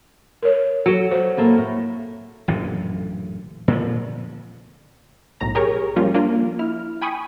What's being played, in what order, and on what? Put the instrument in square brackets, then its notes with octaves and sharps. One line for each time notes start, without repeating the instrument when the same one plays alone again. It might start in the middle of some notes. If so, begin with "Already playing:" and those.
[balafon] A#4 C#5
[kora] F#3 [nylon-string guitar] A4 F#5
[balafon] C5
[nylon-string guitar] A2 A#3 A4
A2
[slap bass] A1 F#2 A#2 D3
A#2 D3 F3
[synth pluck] B1 A2 A#5 A#6
G4 G#4 A#4 C#5 A#5 C#6
F3 G3 A#3 C#4 F4
A#3 D4 F4
E4 F6
G5 G#5 B5 C#6 D#6